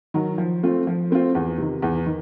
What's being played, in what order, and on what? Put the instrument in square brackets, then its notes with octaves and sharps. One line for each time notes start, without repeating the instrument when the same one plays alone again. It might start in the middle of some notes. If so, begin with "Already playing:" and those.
[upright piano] D#3 F#3
F3
A3 C4 F4
F3
A3 C4 F4
E2
C3 D#3
E2
D#3